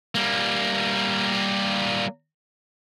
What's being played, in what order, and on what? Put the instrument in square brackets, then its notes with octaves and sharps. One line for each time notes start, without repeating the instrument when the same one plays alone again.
[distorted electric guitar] G3 A#3